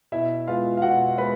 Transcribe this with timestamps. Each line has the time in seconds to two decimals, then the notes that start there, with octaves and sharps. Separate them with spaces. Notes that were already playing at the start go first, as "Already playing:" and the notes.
0.12 B2 E4 E5
0.47 G#3 B3 F4 F5
0.77 F5
0.82 B2 F#4 F#5
1.18 G#3 B3 B4 B5